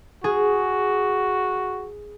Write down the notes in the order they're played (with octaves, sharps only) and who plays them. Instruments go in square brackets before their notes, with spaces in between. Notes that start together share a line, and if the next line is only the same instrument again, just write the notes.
[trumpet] F#4 [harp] G#4